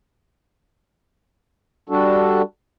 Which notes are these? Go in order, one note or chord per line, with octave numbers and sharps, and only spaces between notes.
G3 D4 F#4 A4